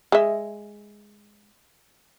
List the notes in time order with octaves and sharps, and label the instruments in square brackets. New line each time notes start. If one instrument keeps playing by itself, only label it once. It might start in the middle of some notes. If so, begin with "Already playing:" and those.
[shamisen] G#3 E5